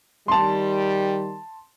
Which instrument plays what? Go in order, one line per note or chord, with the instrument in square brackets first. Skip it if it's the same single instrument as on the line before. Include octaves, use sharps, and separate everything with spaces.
[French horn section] D#3 G3 [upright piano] A5 C6